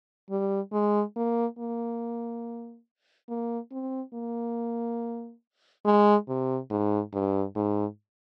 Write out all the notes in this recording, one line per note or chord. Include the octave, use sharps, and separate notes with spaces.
G3
G#3
A#3
A#3
A#3
C4
A#3
G#3
C3
G#2
G2
G#2